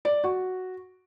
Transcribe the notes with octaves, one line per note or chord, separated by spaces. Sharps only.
D5
F#4